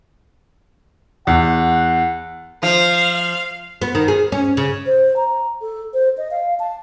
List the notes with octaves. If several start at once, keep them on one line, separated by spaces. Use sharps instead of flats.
E2 F#5
F3 F5
B3
D#3
G#4
C#4
C#3
C5
A#5
A4
C5
D#5
F5
A5